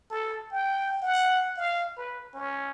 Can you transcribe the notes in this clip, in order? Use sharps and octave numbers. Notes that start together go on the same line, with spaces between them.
A4
G5
F#5
F5
B4
C#4